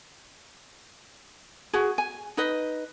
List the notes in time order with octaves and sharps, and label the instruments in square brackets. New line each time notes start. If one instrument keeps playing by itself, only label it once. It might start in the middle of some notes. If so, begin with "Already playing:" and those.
[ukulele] F#4 G#4
G#5
D#4 B4 D#5